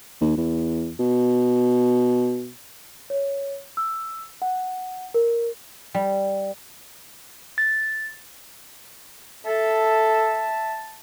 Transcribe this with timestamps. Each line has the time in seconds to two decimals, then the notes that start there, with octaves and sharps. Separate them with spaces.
0.21 D#2
0.37 E2
0.99 B2
3.10 C#5
3.77 E6
4.42 F#5
5.14 A#4
5.94 G3
7.58 A6
9.46 A4 E5 A5